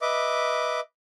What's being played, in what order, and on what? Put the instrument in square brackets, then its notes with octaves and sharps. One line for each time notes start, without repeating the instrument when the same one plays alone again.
[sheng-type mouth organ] B4 D#5 E5 D6